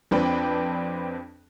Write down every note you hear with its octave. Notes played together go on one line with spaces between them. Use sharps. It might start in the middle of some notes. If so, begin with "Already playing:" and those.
F2 C4 D4 B4 G5